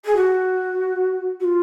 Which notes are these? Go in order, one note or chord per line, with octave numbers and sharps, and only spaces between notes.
G#4
F#4
F#4
F4